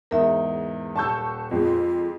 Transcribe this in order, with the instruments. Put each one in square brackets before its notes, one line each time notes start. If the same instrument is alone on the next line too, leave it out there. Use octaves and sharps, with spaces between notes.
[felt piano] E2 G#2 D#4 [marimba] A#4 E5
[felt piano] D#1 E6 [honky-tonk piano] A5 C#6 G6
[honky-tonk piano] F2 G#3 C4 [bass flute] F4